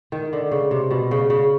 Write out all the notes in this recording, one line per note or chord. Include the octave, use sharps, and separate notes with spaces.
D#3
D3
C#3
C3
B2
C#3
C#3